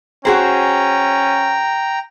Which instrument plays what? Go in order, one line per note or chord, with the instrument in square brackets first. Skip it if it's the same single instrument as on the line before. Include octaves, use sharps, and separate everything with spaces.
[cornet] C#4 [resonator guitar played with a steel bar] F#4 G#4 C5 [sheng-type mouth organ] G5 A#5